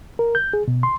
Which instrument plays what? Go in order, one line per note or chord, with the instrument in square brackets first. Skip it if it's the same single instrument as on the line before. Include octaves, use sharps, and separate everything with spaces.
[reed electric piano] A#4
G6
G#4
B2
C6